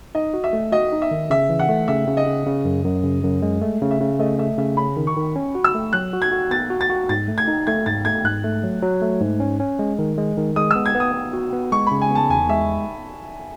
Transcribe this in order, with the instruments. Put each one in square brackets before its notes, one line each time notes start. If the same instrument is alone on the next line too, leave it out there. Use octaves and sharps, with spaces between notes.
[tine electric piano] D#4 [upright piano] D#5
[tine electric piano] F#4
[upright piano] E5
[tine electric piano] A3
[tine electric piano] F#4 [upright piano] D#5
[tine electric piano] D#4
[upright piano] E5
[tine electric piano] D#3
[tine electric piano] C#3 [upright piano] E5
[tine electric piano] E3
[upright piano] F#5
[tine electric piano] A3
[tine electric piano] C#3 [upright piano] E5
[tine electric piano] C#3
[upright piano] D#5
[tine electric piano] C#3
C#3
F#2
F#2
C#3
F#2
G#3
A3
C#3
[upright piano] E5
[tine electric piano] C#3
[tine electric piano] A3 [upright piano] D#5
[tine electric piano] A3 [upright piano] E5
[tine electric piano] C#3 [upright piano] E5
[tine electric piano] C#4 [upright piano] B5
[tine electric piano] D#3
[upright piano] C#6
[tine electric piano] D#3
C#4
F#4
[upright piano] E6
[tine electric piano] A3
[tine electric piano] F#3 [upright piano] F#6
[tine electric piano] F#4
[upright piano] G#6
[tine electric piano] F#4
[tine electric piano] B3 [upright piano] A6
[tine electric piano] F#4
[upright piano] A6
[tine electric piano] F#4
[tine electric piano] G#2 [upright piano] A6
[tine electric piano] A3
[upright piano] G#6
[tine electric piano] D#4
[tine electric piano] A3 [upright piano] G#6
[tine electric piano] G#2 [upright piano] A6
[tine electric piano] A3 [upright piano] G#6
[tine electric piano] G#2 [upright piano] F#6
[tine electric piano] A3
F#3
F#3
A3
G#2
C#4
C#4
G#3
D#3
G#3
D#3
[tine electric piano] G#3 [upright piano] D#6
[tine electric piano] B3 [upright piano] E6
[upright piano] G#6
[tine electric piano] B3
[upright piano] D#6
[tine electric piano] B3
F#4
B3
[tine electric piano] G#3 [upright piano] C#6
[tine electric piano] C#3 [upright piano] B5
[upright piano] G#5
[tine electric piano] B3 [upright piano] A5
[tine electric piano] E2 [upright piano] G#5
[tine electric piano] G#3 [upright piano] E5